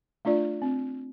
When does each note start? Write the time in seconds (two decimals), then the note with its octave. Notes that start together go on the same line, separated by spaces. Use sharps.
0.25 A3 D4 F4 D5
0.62 C4